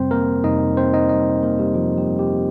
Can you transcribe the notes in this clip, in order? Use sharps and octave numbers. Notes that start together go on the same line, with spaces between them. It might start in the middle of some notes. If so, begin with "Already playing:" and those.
Already playing: F2 C3 G3 C4 C5
A#3 A#4
F2 C3 G3 D#4 D#5
C4 C5
D#4 D#5
F2 C3 G3 D#4 D#5
A#3 A#4
G3 G4
F2 C3 F3 G3 F4
G3 G4
G3 G4